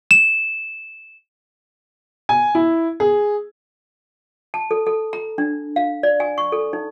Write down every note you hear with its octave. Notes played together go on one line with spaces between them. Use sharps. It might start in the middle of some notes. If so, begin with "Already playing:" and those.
E7
G#5
E4
G#4
A5
A4
A4
A#5
D4
F5
D5
G#5
C#6
A4
D#4